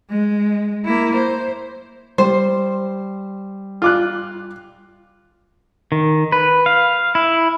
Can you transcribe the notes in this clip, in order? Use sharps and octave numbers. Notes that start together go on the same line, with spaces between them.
G#3
A#3 E4
C5
G3 C5
F4 D6 F#6
D#3
B4
F5
E4